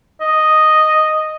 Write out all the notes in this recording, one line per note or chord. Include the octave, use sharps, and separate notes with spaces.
D#5